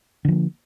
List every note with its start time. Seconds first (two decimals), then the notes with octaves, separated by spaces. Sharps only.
0.25 D3
0.28 F3
0.32 A#3